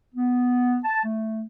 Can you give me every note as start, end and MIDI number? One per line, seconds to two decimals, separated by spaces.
0.14 0.77 59
0.83 0.99 81
1.03 1.42 57